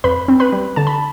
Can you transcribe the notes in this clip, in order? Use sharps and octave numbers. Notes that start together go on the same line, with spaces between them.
F2 B4 B5
C4
B4 B5
G3
D3 A5
B5